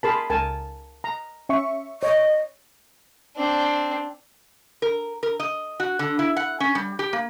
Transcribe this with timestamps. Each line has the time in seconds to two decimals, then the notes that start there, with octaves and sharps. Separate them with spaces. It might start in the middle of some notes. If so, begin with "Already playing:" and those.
0.03 G#4 A#4 A5 B5 C6
0.30 C#2 A#4 G#5 A5
1.04 A#5
1.49 C#4 E5 C#6
2.03 C#5 D#5
3.36 C4 D4
4.82 A#4
5.23 A#4
5.40 D#5
5.80 F#4
5.99 D3
6.19 E4
6.36 F#5
6.60 C#4
6.75 G3
6.99 G4
7.13 A#3